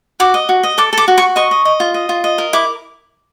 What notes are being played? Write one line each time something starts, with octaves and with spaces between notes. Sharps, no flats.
F#4 D6
D#5
F#4
D#5
A4 D6
A4 D6
F#4
C#6
F#4
D#5 C#6
D#5
D#5
F4
D#5
F4
D#5
A#4
E4 D6